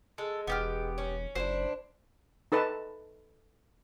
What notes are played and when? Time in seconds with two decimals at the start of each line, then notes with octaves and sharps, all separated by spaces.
0.18 G#3 A4
0.47 E1 B3 G4 F6
0.98 C#4
1.35 F#1 D4 E4 F#4 C5
2.52 D#4 A4 B4 A5